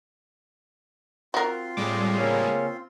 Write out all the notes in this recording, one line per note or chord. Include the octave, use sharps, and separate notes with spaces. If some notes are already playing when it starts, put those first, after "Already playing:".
C4 F4 F#4 A#4 C6
A2 G3 G#3 D6
C#3 A#3 C#4